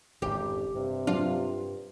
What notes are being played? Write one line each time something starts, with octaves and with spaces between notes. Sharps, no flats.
G#1 F2 C#3 G4
G2 C3
F#3 D4 F4